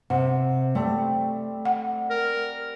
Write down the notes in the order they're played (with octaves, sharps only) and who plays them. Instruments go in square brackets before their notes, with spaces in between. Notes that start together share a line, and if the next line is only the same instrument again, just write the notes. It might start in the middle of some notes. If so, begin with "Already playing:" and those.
[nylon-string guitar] C3 [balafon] F#5
[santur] G3 C4 [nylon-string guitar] A3
[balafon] F#5
[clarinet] A#4